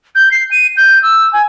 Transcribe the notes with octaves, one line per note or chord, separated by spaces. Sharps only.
G6
C7
D#7
G6
E6
G#5